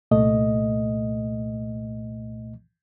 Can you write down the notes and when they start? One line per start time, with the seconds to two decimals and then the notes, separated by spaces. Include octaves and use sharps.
0.11 C2 A#2 A3 D#5